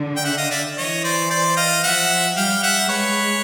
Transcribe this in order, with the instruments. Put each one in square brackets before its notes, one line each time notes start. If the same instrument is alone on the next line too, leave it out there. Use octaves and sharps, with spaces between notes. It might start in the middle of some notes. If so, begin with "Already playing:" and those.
Already playing: [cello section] D3
[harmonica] G5
E5 F#5
D#5 F5
D5 E5
[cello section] E3 [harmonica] C#5 D#5
[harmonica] C5 D5
C5 D5
D#5 F5
[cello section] F3 [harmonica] E5 F#5
[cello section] G3 [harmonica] F5 G5
[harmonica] E5 F#5
[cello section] G#3 [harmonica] B4 C#5